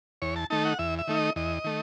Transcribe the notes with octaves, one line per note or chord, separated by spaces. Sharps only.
E2 C#5
A5
D#3 A3 D#4 A5
F#5
E2 E5
E5
D#3 A3 D#4
D#5
E2 D#5
D#3 A3